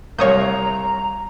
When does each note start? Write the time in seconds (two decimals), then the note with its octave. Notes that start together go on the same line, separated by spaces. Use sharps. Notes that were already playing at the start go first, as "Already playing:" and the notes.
0.19 C2 C#5 F5 A#5 D#6 G6